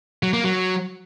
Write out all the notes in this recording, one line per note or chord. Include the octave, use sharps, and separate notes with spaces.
F#3
A#3
F#3